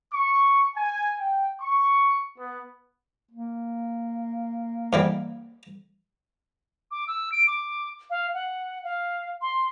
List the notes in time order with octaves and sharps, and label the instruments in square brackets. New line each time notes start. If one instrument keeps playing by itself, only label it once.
[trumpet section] C#6
G#5
G5
C#6
B3
[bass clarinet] A#3
[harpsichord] G#2 E3 G3
[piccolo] D6
E6
D7
D6
F5
F#5
F5
C6